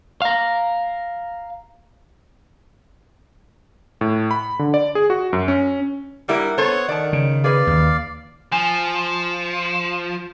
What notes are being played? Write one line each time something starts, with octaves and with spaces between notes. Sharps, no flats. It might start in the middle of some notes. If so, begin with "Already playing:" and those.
F5 A#5
A2
B5
D3
D5
G#4
F#4
F#2
C#4
G3 A#3 E4 A#4 F#5
B3 A4 C5 C#5
D#3 D5 A5
C#3
G#4 B4 D5 F5
D#2
F3 G#5